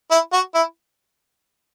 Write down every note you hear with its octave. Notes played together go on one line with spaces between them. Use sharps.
E4
F#4
E4